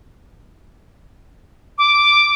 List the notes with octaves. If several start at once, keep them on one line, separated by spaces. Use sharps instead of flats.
D6